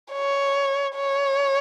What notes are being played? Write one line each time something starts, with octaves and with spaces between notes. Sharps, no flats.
C#5
C#5